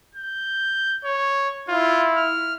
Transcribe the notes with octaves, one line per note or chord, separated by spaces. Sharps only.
G6
C#5
E4 F4
F6